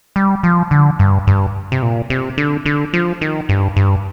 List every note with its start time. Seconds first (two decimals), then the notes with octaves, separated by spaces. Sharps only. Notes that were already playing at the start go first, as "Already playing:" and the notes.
0.16 G3
0.43 F3
0.71 D3
0.99 G2
1.27 G2
1.72 C3
1.82 A#2
2.10 C3
2.38 D3
2.66 D3
2.94 F3
3.21 D#3
3.49 G2
3.77 G2